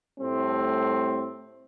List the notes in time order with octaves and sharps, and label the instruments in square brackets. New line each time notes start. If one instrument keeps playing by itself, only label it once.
[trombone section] A2 G3 A3 C4